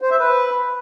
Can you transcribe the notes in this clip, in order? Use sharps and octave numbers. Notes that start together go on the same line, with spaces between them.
C5
E5
B4